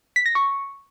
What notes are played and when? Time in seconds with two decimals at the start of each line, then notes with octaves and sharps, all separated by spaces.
0.16 B6
0.26 A#6
0.35 C#6